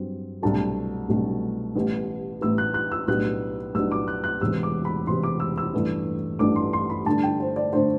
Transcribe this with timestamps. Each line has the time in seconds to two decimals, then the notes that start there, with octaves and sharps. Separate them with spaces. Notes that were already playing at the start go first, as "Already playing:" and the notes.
Already playing: G2 F#3 C4
0.42 C2 B2 F#3 A3 D4 A5
1.09 C2 B2 F#3 A3 D4
1.75 A1 A2 G3 B3
2.41 A1 A2 G3 B3 E6
2.58 F#6
2.74 F#6
2.92 E6
3.08 B1 A2 G3 B3 D4 F#6
3.74 B1 A2 G3 B3 D4 E6
3.92 D6
4.08 F#6
4.24 F#6
4.41 E1 E2 C3 E6
4.63 D6
4.85 B5
5.07 E1 E2 C3 C6
5.23 D6
5.40 E6
5.58 E6
5.73 A1 G2 E3 A3 D4
6.39 A1 G2 E3 A3 D4 D6
6.56 C6
6.73 C6
6.90 B5
7.06 G2 D3 A3 D4 A5
7.23 G5
7.40 C5
7.56 D5
7.73 D3 A3 D4 C5